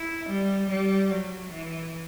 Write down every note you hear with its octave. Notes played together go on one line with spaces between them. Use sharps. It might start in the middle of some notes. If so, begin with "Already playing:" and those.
Already playing: E4
G3
G3
F#3
E3